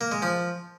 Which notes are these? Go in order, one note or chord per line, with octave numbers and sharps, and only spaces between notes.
A#3
G#3
F3